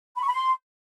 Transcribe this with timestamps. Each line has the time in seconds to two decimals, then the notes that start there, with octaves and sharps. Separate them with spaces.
0.16 B5
0.22 C#6
0.28 B5
0.33 C6